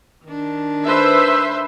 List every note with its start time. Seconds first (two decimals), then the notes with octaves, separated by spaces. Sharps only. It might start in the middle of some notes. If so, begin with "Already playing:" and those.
0.25 D#3 D4
0.86 B4 C5 E5